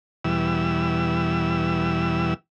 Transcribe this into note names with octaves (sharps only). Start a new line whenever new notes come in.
E2 B2 E3 G3 E6